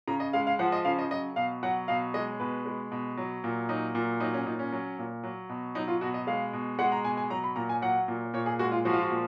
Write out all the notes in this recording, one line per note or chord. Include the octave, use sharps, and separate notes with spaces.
C#3 A#5
D#5
G#3 F5
F5
F3 F#5
D#5
C#3 F5
D#5
F#3 D#5
B2 F5
F#3 F#5
B2 F5
G#3 D#5
B2 B4
G#3
B2
F#3
A#2
F#3 D#4
A#2
F#3 D#4
C#4
A#2 D#4
C#4
F#3
A#2
F#3
B2
F#3 D#4
F4
B2 F#4
D#5
G#3 F5
B2
G#3 F#5
A#5
B2 G#5
G#5
F#3 A#5
B5
A#2 A#5
G#5
F#3 F#5
A#2
A#2 C#5
G#4
G#3 F#4
F4
F3 F#4
F4
F#4
A#2